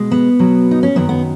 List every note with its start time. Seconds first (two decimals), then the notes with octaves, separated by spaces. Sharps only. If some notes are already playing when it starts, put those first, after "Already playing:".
Already playing: B2 G#3
0.11 B3
0.39 B2 F#3
0.71 D#4
0.83 C#4
0.95 F#2 D#3 F#3 B3
1.09 B3